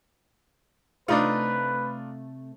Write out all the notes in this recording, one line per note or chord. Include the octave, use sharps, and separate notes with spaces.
C3 A3 D4 D#4 F4 B4 C#5